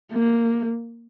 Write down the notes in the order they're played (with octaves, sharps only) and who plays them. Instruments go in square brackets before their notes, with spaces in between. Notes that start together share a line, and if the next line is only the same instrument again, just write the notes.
[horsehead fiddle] A#3